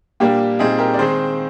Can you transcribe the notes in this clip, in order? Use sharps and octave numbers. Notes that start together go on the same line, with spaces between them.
A#2 G3 A#3 D4 G4
A#2 G3 C4 D#4 G#4
G4 A#4
D5
D#3 G#3 C4 G#4 C5